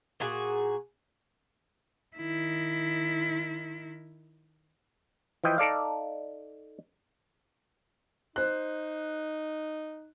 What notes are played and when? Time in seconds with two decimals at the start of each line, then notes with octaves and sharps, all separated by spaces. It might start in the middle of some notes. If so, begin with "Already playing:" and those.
0.20 A#2 F#4 G#4
2.17 D#3 E4
5.44 E3 F3 D#5 G5
5.58 D#4 A4 D5 F5
8.36 D#4 C5 F#6